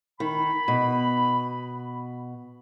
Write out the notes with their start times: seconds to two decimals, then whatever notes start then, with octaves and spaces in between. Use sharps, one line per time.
0.20 D#3 B5
0.68 B2